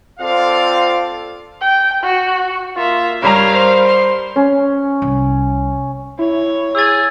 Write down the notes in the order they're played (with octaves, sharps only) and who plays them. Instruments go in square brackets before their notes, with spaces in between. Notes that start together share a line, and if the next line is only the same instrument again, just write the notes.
[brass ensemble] C4 F4 A4 C5 D5 F5
[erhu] G5
F#4
[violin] A#3 E5 [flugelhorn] F4
[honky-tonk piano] G2 G3 A#5 [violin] A#4 F5 [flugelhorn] C#5
[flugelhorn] C5
[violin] C6
[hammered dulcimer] C#4
[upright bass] C2
[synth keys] E4 [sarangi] C#5
[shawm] G#4 [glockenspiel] E6 A6